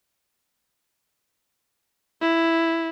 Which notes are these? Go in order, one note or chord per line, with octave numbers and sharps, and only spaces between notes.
E4